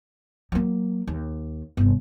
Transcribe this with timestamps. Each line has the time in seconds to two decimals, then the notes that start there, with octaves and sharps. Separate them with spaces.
0.52 F#3 A#3
1.07 D#2
1.77 G1 C3